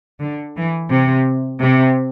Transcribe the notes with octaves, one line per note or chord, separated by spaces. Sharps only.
D3
E3
C3
C3